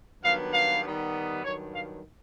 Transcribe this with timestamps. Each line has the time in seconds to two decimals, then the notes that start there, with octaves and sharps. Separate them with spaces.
0.23 G2 D#3 F#3 B3 F5
0.53 F5
0.82 D#3 G3 B3
1.43 G2 D#3 F#3 C#5
1.72 F5